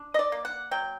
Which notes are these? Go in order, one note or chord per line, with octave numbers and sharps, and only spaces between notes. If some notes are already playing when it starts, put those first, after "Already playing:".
Already playing: D4
D#5
D5
A#3
F#5
F#3 G5